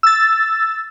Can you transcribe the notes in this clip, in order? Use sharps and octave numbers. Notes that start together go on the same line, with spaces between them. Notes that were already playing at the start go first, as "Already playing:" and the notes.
E6 A6